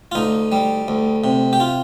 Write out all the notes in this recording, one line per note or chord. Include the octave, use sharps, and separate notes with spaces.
F4
D2 D#4
G3
D2
C3
G4
F4